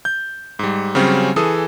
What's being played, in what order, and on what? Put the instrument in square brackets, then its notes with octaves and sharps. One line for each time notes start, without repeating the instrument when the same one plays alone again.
[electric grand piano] G6
G#2 G3
C#3 F#3 G3 C4 C#4
E3 G#4 A4 D#6